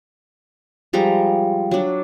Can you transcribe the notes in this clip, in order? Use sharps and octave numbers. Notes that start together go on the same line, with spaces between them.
F3 G3 G#3 A#5
F#3 D4